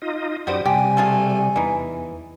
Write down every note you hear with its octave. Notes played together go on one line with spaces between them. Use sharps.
D#4 F4 D#5
F#2 G3 F#4 G4 C5 D#6
C3 G3 G4 G#5
A3 F4 G#4
E2 E3 D#4